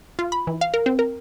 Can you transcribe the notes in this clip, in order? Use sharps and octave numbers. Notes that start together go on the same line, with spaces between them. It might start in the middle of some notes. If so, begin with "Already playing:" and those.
F4
B5
E3
F5
A#4
C4
A#4